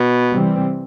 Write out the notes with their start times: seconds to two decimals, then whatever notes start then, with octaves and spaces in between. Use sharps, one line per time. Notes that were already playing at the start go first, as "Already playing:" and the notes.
Already playing: B2
0.30 C3 E3 G3 C4